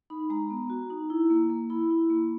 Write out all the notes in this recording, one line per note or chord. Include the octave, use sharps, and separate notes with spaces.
D#4 B5
G#3 A#5
B3
F#4
D#4
E4
A#3
A#3
E4 B5
E4
A#3